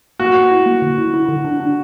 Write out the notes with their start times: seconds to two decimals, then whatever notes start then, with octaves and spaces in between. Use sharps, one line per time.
0.20 A#3 F#4
0.35 B4
0.51 E4
0.66 A#3
0.82 D3
0.98 E4
1.14 E4
1.28 D3
1.45 D4
1.60 D4